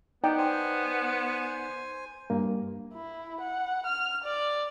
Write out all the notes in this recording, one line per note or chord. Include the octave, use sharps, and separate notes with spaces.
B3 D#4 D5 G5
C5 G#5
G2 A#3
E4
F#5
F6
D5